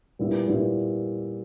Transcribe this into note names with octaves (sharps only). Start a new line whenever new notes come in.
A#2 G3 B3 E4
A#2 G3 B3 E4